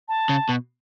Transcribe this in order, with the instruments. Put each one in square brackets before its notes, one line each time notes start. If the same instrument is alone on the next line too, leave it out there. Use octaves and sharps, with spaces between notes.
[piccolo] A5
[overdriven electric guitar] C#3
B2